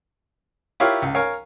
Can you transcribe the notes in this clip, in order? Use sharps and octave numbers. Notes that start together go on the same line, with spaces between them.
E4 F4 G4 A#4 C#5 F5
C#2
A#4 C#5 F5 G#5